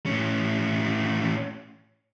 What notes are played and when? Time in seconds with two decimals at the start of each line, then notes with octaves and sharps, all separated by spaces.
0.06 A2 C#4